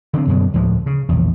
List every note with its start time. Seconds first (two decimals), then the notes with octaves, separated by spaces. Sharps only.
0.14 D3 D#3 C4
0.28 F#2 B2 D3
0.54 D2 A2 F3 G#3
0.86 C#3
1.09 A#1 E2